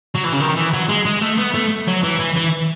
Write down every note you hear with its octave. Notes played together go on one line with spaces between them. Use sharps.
F#3
E3
C#3
D#3
E3
F#3
G#3
G#3
A3
B3
A3
F#3
E3
E3
E3